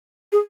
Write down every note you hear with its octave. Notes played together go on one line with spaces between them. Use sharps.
G#4